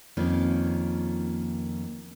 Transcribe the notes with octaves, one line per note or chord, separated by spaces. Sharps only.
F2 D#3 A#3 C#4 F4